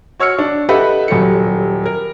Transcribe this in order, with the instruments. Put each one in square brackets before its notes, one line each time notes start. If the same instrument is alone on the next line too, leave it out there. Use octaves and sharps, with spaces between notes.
[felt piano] F#4 C#5 E6 F6 C#7
D4
G4 A4 B4 D#5 E5 F#5
D#1 F#3 G4 A4 C#7
A#4